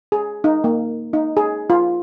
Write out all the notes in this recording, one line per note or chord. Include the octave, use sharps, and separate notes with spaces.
G#4
D#4
A#3
D#4
G#4
F4